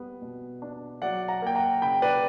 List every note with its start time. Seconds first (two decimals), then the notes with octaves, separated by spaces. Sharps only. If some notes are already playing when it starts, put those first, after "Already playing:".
Already playing: G3 B3
0.22 B2
0.62 D4
1.02 F#3 D5 F#5
1.28 F#5 A#5
1.42 A#3 G5
1.55 F#5 A#5
1.82 C#3 G5 B5
2.02 B4 D5